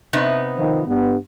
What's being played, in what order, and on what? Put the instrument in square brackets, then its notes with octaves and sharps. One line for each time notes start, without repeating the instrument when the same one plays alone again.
[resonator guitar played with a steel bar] C3 B3 D#4
[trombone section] D#3 F3
G2 B3